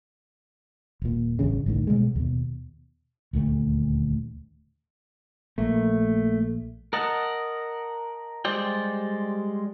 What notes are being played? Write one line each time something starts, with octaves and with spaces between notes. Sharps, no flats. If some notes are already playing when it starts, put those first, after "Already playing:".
D#1 A#2
A1 E2 G2 C#3
G1 C2 A2 D#3
B2 D#3 G3 G#3
D#2 B2
D#1 D2 A3
A#1 A3 A#3
A#4 D#5 F#5 A5
G3 G#3 C5 D5 G5